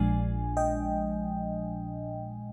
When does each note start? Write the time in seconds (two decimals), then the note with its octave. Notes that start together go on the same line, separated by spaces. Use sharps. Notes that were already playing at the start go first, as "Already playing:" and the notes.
Already playing: A#1 A#2 F3 G#3 D4 G#5
0.57 D#5 G5